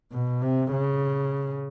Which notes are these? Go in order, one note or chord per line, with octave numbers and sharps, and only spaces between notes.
B2
C3
C#3